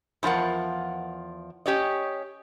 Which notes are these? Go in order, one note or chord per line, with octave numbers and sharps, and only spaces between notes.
E2 F3 F4 A#4 F#5
C#4 G4 C#5 D#5